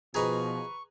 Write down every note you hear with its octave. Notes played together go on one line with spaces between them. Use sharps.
B2 F3 D#4 G#4 B4 A#5 C#6